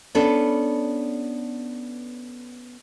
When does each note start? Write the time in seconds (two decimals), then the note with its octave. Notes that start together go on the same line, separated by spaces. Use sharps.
0.15 B3 C#4 D4 A4 B4